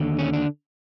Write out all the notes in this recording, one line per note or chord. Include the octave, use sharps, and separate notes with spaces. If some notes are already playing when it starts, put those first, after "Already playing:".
Already playing: D#2 D3
C#4
D4